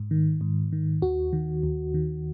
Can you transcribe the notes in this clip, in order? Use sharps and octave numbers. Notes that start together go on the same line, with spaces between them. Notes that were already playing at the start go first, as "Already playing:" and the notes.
Already playing: G#2
D#3
G#2
D#3
D#2 F#4
D#3
D#2
D#3